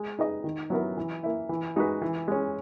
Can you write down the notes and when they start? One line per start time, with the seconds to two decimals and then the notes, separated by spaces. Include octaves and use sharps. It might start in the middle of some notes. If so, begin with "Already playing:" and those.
Already playing: G#3
0.19 D#4 G#4 B4 D#5
0.44 D#3
0.70 F#3 B3 E4 A#4
0.97 E3
1.23 A#3 E4
1.49 E3
1.76 G#3 D#4 F#4 B4
2.02 E3
2.28 G#3 C#4